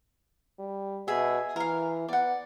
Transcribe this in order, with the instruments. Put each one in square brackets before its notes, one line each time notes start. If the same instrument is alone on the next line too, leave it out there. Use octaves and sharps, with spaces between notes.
[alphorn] G3
[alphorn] B2 [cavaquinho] G#4 E5
[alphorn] E3 [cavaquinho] A#4 F5
[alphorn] B3 [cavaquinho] D5 F#5